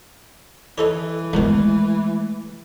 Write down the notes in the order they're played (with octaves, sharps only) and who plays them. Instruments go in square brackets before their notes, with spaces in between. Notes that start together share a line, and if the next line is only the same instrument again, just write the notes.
[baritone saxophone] E3 [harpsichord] D#4 A4 C#5
[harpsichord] E2 B2 D#3 [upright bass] G#3 A3